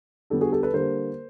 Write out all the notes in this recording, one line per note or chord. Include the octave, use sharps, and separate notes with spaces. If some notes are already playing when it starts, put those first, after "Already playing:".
D3 G3 B3 G4 A4
F#4 G#4
G4 A4
A4 B4
D3 G3 A#3 A#4 C5